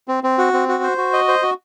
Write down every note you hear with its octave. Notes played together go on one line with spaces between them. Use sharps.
C4
C4
F#4
C4
F#4
C5
F#4
D#5
C5
F#4